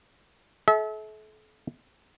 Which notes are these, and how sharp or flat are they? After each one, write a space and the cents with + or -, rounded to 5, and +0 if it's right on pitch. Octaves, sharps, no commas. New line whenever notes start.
A4 -40 E5 -30